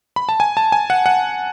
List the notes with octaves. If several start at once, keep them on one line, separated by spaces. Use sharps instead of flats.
B5
A5
G#5
A5
G#5
F#5
F#5